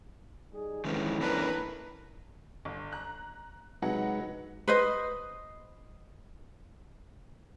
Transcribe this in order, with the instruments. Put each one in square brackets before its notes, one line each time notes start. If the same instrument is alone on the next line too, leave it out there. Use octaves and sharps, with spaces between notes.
[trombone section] G3 D#4 G#4
[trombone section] F2 G#2 E3 [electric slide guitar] D#3 G#3 C#4
[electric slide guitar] A#3 C#4 D4 [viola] A#4 B4
[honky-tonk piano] G1
A#5 F#6
[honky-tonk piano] C3 F#3 F#5 [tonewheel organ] G#3 D#4 B4
[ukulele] B4 C5 D#5